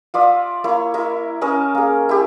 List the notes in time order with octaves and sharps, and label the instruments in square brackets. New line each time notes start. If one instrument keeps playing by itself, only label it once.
[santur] F4 D5 E5 D#6
A#3 E4 C#5
E4 A#4 D#5 E5
C#4 A#4 D#5 A5
A#3 G#4
E4 G4 G#4